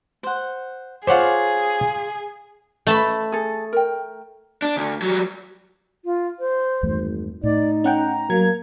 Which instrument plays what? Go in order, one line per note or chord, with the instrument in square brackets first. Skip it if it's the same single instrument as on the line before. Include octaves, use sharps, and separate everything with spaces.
[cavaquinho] C5 F#5
[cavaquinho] F4 D6 [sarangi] G#4 [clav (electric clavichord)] C5 C#5 F#5
[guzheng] A3 A5 B5 [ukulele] A4 B4
[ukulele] G#4 A4
A#4 G5
[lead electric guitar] D4
D2
F#3 G3
[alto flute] F4
C5
[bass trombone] G#1 [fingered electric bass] E2 G2 A3
[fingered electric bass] A2 [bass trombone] D#4 [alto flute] D5
[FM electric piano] C#4 F#5 G5 [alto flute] A#5
[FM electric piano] F#3 G#6 [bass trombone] A#3